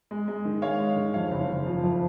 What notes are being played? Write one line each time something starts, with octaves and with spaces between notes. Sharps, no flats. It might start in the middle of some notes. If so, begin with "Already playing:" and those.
G#3
G#3
D#3
G#3 C#5 F5
G#3
D#3
F2 C#5 F5
F#1
F#1
F3
F2